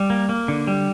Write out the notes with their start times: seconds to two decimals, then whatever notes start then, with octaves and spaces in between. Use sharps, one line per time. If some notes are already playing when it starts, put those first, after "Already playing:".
Already playing: G3
0.10 A#3
0.29 A#3
0.48 D3
0.67 G3